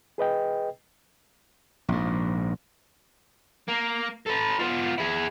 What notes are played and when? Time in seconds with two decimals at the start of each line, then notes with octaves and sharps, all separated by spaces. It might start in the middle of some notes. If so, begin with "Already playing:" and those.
0.18 G#4 B4 D#5 G5
1.88 A#1 G#2
3.68 A#3
4.26 A4 B4
4.59 B3 F4
4.98 E4 G#4